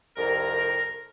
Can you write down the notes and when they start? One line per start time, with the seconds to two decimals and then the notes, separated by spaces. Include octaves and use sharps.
0.17 C2 F2 A#4